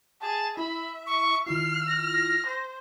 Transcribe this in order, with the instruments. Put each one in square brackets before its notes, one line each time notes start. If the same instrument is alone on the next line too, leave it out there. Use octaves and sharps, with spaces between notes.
[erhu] G#4 [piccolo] A5
[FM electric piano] E4 [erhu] E5 [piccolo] B5
[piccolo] C#6
[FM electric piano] D#3 E4 F4 [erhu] F6 [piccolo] C7
[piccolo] A#6
[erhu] C5